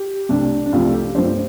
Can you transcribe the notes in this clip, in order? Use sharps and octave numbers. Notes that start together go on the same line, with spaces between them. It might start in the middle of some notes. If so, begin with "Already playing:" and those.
Already playing: G4
C2 C3 A3 D4
D4
C2 C3 F3 A3 F4
A4
G4
G1 G2 F3 A3 C5